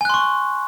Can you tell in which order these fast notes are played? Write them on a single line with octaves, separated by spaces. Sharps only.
G#5 F#6 C6 C#6